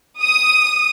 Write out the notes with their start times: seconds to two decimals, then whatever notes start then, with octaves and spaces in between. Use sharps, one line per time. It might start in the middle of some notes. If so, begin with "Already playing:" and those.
0.22 D#6